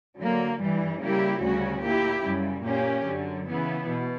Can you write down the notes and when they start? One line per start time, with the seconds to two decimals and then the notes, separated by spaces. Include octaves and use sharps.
0.18 D3 F#3 A#3
0.59 G2 E3 G3
1.00 C#3 G3 A#3 E4 G4
1.41 D2 C#3 G3 C#4 F#4
1.82 A#2 A#3 E4 G4
2.23 F#2 C#3 G3
2.64 A#2 A#3 C#4 G4
3.06 F#2 D3 F#3
3.46 C#3 E3 B3 E4
3.87 B2